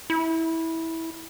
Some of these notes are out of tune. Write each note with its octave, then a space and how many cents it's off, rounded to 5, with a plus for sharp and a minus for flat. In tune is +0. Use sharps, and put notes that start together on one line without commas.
E4 -15